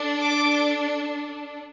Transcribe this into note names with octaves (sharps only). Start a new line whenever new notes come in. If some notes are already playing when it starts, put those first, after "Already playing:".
Already playing: D4 A4
D6